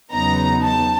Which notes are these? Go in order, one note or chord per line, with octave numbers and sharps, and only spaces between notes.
E2 C#3 F#3 B3 D#4 A#5
A5